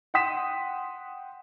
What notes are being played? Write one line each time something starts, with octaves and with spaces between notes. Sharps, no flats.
F#5 G5 C6 D#6 B6 E7